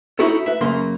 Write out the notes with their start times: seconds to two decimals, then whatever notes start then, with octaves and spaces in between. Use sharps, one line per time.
0.19 D#4 E4 F#4 A4 C#5
0.46 B4 E5
0.61 F#2 C#3 A#3 C6